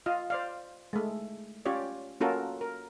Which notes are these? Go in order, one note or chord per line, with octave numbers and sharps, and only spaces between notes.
F4 D#5 F5
C5 D5 F5
G#3 A3
C#4 F4 G4 C#5 D5
A#3 C#4 F4 F#4 A4 A#4
A#4